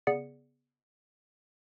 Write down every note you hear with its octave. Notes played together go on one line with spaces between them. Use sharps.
C#3 B3 G#4 D5 C#7